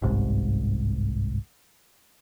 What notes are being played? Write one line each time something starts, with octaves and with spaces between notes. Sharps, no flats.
G1 C2 G#2